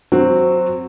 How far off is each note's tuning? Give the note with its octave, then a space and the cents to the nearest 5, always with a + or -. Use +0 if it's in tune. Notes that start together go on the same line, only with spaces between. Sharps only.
F#3 -10 C4 +0 F#4 +0